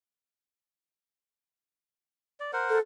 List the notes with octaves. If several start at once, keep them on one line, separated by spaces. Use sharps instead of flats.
D5
A#4 C5 F#5
A4